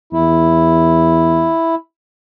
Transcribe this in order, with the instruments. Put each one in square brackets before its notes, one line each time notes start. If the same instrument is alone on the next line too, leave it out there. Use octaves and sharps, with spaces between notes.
[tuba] E2 [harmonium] E4